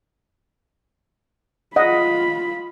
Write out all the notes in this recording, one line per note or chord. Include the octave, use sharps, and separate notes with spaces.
F4 D#5 F#5 B5